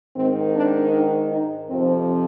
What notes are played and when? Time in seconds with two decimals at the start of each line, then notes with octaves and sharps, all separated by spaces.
0.15 G#2 D#3 C4
0.54 D4
0.93 D#4
1.31 D#4
1.69 F2 C3 F3 C4